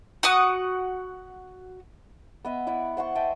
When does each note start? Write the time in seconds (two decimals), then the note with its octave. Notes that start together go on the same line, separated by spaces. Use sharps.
0.23 F#4 F#5 D#6
2.45 B3 D#5 E5
2.67 E4 D5 E5 F#5
2.97 C5 F#5 C6 C#6
3.15 D#5 E5 G5 A5